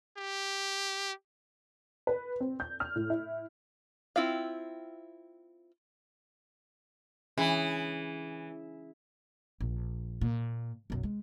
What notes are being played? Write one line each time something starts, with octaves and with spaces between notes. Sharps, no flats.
G4
B4
C4
G6
F6
A2
E4
C4 E4 F4 F5
E3 C#4 D4 G#4 B5
A#1
A#2
B1 F#2
G#3